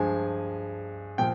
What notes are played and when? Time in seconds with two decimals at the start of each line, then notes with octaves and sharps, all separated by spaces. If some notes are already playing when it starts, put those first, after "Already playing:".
Already playing: G2 F3 G#3 G#5
1.18 A#2 F3 G5